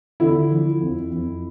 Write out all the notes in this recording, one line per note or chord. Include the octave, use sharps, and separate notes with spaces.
D3 E4
F3
F2
F2